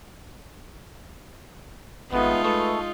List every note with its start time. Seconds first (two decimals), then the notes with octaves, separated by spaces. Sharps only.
2.12 G#1 G#3 A3 B3 D#4 F4
2.44 A3 A4 B4 C#6 D#6